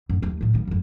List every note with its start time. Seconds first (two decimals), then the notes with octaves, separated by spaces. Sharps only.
0.09 F#2
0.22 D#2 A3
0.41 A2 C#3
0.53 D#3 G3
0.68 G1 F2